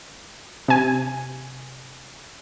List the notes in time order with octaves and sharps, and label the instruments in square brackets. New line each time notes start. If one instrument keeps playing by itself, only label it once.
[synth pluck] C3 G#5